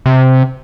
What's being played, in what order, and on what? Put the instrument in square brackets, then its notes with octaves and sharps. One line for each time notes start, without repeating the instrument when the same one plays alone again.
[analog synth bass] C3